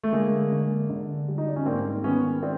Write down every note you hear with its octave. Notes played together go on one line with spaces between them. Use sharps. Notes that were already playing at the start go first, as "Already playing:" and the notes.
A3
D3 G#3 A#3
D3
D3
G3
D#4
D4
C#4
G#2 A#3 C4
D#3 B3 C#4
C4 D4